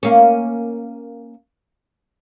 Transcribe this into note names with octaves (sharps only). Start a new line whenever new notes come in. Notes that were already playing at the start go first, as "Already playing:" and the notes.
A#3 C#4